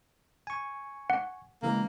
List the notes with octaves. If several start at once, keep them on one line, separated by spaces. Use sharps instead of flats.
G#5 C#6
F#5
C#3 E3 G#3 A#3